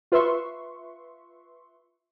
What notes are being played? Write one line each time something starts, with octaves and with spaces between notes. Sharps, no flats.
F4 B4 E5 C6 C#6